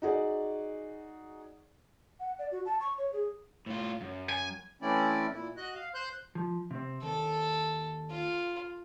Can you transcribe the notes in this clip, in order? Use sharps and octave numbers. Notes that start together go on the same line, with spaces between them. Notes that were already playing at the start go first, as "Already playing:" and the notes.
D#4 F#4 G#4 D5
F#5
D5
F#4
A5
C#6
C#5
G#4
A2 F4
F#2
G#5
E3 A3 C4 C#4 E4 D5
A#2 E4
F#4 D#5 F#6
F5
C5 C6 F#6 G6
F3
C3 C4
D#2 A4
F4